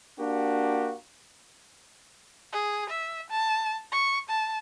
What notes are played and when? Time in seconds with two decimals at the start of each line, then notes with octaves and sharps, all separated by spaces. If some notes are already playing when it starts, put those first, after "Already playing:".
0.20 A#3 D4 F#4 G4
2.53 G#4
2.90 E5
3.30 A5
3.92 C#6
4.29 A5